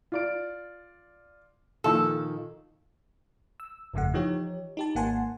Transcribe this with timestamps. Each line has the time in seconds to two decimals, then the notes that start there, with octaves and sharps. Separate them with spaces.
0.12 F4 D5 D7
1.84 A#2 D#3 F3 A4
3.60 E6
3.94 G1 F2 C#3 A3 F#5
4.14 E3 F3 D#4 G4 C#5
4.77 D#4 G4 A5
4.95 G#1 A#3 F#5 G#5 A5 C6